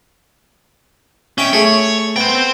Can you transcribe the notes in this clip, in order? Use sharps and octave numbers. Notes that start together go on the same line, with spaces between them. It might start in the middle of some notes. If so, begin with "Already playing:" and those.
C#4 D#5 E5 G5
A3 G#4 C#5 E5
B3 C5 G5